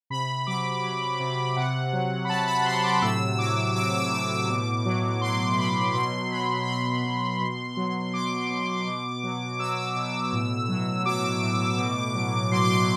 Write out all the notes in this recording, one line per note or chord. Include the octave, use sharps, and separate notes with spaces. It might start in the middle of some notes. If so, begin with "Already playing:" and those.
C3 B5
F#3 D6
F#3
C3
C3 F#5
F#3
B5
F#3 A5
B5
C3 C6
D6
A2 E6
F#3 D6
F#3 D6
E6
A2 E6
D6
B2 D6
F#3
F#3 C6
C6
B2 B5
B2 C6
F#3 B5
B5
F#3 C6
B2
B2
F#3
F#3 D6
B2
B2
F#3
F#3 E6
B2
A2
F#3
F#3 D6
A2
B2
F#3
F#3 C6
D6
C6